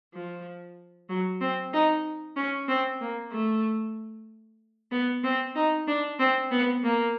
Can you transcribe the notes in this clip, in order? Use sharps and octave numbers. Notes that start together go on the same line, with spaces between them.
F3
F#3
C4
D#4
C#4
C4
A#3
A3
B3
C4
D#4
D4
C4
B3
A#3